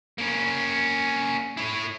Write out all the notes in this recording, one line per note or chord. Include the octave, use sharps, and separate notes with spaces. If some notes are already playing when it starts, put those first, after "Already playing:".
A#3 C#4
E4 C#5